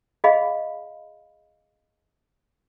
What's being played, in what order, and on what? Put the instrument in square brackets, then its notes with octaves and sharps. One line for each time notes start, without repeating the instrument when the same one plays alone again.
[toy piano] G#4 D#5 F5 B5